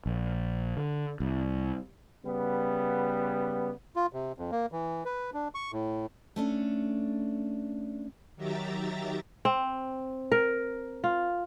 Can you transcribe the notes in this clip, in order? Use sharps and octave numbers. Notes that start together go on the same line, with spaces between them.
A#1
D3
C2
C#3 G3 B3
F4
C3
F2
A#3
E3
B4
D4
C#6
A2
A3 C#4 D4
D#3 F#3 G4 E5 A#5 A6
C4
A#4
F4